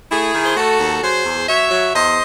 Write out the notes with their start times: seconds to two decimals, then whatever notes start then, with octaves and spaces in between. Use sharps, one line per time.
0.11 A3 E4 G#4
0.34 D#3
0.46 C5
0.56 A3 F#4 A4
0.80 D#2
1.03 F#3 G#4 C5
1.25 E2
1.48 F#3 C#5 E5
1.71 F#3
1.94 E2 C5 D#5